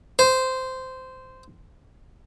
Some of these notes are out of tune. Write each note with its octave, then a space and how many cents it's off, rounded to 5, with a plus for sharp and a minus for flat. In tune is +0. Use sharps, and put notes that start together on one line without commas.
C5 -10